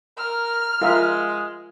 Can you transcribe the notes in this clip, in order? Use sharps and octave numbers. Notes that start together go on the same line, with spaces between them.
A#4 F6
G#3 F4 A#4 E5